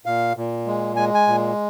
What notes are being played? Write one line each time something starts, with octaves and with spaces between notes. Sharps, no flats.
A#2 F5
A#2
G#3
G#3 G#5
G#5
A#2